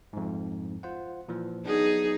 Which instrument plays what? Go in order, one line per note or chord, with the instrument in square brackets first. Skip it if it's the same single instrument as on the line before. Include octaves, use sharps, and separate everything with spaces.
[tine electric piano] F2 G#2
F4 C5 F#5
A#2 E3 F3
[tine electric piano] F#3 B3 D4 [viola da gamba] D#4 G#4